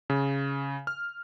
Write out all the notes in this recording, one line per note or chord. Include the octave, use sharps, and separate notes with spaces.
C#3
F6